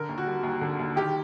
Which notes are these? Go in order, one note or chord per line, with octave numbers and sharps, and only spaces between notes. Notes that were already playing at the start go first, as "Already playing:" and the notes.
Already playing: D3 A#4
D#2
F#4
G3
D#2
D3
D#2
D#3 G4